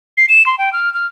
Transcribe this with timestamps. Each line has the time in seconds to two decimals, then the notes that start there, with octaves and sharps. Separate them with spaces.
0.17 C7
0.29 E7
0.46 C6
0.58 G5
0.73 F6
0.94 F6